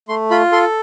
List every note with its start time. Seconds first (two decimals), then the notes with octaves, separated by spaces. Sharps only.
0.08 A3 C6
0.31 F4 B5
0.52 A4 C6